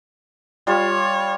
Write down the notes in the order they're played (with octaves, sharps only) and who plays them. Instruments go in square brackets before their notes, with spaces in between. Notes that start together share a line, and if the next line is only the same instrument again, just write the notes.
[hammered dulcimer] G3 F4 [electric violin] C#5